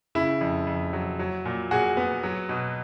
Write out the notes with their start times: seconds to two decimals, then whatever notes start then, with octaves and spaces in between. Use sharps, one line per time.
0.15 C#3 E4
0.41 F2
0.67 F2
0.93 F#3
1.19 F#3
1.45 A#2
1.71 A#2 F#4 G#4
1.97 B3
2.23 F#3
2.49 B2